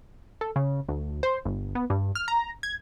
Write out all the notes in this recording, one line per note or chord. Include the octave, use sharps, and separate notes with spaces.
A4
C#3
D2
C5
G1
B3
G2
F6
A#5
G#6